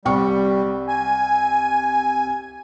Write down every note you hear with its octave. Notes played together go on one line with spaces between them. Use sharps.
C2 G3 G5 C#6
G#5